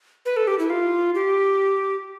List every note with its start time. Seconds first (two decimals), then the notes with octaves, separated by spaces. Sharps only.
0.26 B4
0.37 A4
0.47 G4
0.59 E4
0.70 F4
1.15 G4